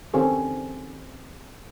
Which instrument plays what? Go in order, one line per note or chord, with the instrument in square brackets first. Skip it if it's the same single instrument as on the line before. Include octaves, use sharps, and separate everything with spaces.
[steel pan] D#3 C4 C#4 G4 A4